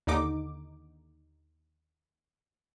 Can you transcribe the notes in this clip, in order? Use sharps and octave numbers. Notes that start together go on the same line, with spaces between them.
D#2 D3 D#4 D6